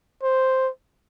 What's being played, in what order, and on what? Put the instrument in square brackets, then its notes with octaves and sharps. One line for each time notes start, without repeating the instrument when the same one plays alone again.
[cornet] C5